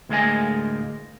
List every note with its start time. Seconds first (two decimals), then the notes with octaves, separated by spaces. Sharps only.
0.09 D2 A2 G#3 A#3 D#5 G#5